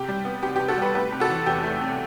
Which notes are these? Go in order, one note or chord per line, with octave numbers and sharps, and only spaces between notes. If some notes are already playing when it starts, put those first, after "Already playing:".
Already playing: C3 G4
G3
B3
C3 G4
G4
C3
F#4 A4
G3 G4 B4
A3 G4 B4
C3
F#4 A4
E3
E2 G4
A3
C3